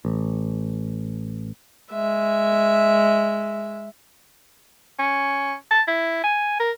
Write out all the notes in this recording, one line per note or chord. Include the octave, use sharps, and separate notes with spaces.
A1
G#3 E5
C#4
A5
E4
G#5
A#4